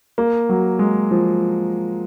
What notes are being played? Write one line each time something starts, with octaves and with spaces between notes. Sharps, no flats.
A#3
F#3
G#3
F3